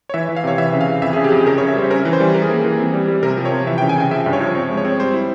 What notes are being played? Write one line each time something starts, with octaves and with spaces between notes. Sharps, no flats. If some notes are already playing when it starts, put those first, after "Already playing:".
C#5
E3 E5
E3
F5
C3 C#5
E3 E5
C#3
F5
E3
F2 E5
G#4
C#3
G4
F2 G#4
C#3 A#4
C#5
C#3
E5
G3 C5
C#4 A#4
E3
C5
G3
E3 A#4
G#4
A#3 A#4
E3
C4
G3
G3
C3 A#4
F3
C#5
C3
E3 E5
G5
C#3
G#5
C#3 G5
F3 E5
G2
C#5
F3
C4 C#5
G#3
C#5
C4
G3 C5
E4